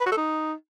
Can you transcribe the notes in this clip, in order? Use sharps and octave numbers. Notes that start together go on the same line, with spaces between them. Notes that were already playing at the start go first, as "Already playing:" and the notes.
B4
F#4
A4
D#4